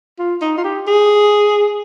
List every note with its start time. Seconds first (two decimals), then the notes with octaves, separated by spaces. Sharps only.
0.19 F4
0.42 D#4
0.57 F4
0.64 G4
0.87 G#4